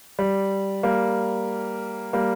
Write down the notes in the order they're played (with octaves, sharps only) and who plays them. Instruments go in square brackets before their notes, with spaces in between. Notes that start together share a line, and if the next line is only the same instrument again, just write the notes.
[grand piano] G3
G3 A#3
G3 A#3